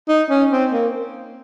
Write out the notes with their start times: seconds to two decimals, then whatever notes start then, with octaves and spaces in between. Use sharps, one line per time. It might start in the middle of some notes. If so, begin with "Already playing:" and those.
0.08 D#4
0.30 C#4
0.51 C4
0.72 A#3